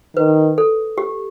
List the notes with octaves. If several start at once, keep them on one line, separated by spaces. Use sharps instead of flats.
D#3 B4
A4
G4